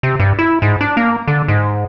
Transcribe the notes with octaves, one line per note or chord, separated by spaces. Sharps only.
C3
G2
E4
G#2
D4
A#3
D3
G#2